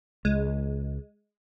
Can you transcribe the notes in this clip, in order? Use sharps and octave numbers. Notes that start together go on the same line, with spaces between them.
C#2 G#3